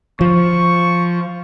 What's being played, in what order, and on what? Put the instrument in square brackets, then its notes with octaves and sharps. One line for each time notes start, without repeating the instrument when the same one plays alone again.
[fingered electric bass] F3 [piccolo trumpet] C#6